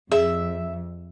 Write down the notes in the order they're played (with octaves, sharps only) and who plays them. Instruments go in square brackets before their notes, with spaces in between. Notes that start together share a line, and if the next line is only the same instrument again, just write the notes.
[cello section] F2 [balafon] G#4 [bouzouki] E5